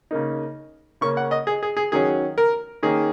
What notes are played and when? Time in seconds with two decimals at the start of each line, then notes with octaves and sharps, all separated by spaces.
0.11 C#3 A#3 D#4
1.01 C#3 A#3 C#4 C#6
1.17 F#5
1.31 D#5
1.47 G#4
1.63 G#4
1.77 G#4
1.92 D#3 F#3 C#4 G#4
2.38 A#4
2.83 D#3 A#3 C#4 G#4